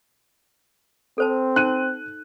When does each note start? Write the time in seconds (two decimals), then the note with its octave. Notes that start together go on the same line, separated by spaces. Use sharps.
1.18 C4 A4 C5 A5
1.56 D#4 F#6 D#7